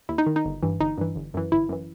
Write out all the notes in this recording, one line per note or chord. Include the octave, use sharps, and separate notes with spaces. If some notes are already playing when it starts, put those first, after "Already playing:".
D#2 E4
D#4
D#3
D#4
G1
G2 E3
G1 D#4
G2 E3
G1
F#2 E3
G1 E4
F#2 E3